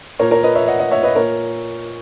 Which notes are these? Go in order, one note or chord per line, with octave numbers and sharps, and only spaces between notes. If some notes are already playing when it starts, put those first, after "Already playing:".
A#2 A#4 C#5
A#4 C#5
B4 D#5
C#5 E5
D#5 F#5
D#5 F#5
C#5 E5
B4 D#5
A#2 A#4 C#5